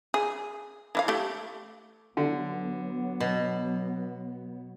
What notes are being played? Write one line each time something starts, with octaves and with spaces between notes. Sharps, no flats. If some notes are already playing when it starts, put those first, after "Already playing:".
G#4
E3 E4 F5
A3 G4
D3 F#3 B3
B2